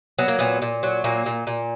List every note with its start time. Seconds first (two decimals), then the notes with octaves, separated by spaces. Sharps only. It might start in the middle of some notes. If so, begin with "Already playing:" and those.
0.19 F#3 B3
0.28 A#3
0.39 A#2 B3
0.62 A#2
0.83 F#3
1.04 A#2 A#3
1.26 A#2
1.47 A#2